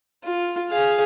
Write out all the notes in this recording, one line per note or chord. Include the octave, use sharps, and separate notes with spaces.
F4
G#4 F5